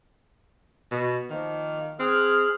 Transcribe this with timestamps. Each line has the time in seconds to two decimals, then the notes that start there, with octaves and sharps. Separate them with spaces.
0.91 B2
1.30 D#3 F3 A#3
1.99 C4 G#4 F6 F#6